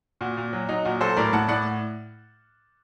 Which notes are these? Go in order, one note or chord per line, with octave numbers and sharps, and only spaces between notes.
A#2 F#4
A#2
F#3
F#3 D#4
A#2 F#4
F#3 A4 C5
A2 A#4 D5
A2 F#5 A5
A2 D5 F#5